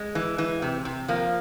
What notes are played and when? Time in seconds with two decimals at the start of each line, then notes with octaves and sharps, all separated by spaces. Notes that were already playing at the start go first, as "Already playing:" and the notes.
Already playing: G#3
0.15 E3
0.38 E3
0.62 C3
0.85 C3
1.08 F3 A#3